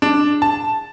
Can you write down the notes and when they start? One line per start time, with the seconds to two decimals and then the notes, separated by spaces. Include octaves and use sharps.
0.02 D4
0.42 A5